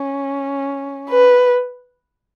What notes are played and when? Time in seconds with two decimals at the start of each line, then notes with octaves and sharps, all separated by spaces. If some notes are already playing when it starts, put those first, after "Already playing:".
Already playing: C#4
1.09 B4